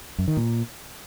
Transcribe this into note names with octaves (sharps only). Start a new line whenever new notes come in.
F#2
D#3
A#2